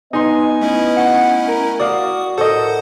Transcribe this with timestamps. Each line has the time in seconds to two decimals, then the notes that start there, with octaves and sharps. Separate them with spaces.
0.13 B3 D#4 D#5 G#5 C6
0.61 A3 C#4 E4
0.97 F#5
1.48 A#4
1.80 F#4 D5 F5 D#6
2.38 A2 A4 A#4 C5 D#5 F#5